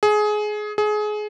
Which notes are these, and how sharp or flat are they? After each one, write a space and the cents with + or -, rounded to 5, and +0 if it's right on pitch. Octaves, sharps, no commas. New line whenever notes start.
G#4 +20
G#4 +25